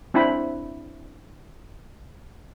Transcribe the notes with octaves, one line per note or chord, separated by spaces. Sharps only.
C4 D4 E4 G5 B5